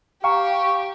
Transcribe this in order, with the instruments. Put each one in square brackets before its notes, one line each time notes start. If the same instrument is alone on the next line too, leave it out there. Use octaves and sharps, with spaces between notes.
[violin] G4 [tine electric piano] F5 [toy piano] G5 A#5 [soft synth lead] C#6